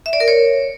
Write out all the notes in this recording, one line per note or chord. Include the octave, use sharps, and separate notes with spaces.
E5
D5
A#4
C#5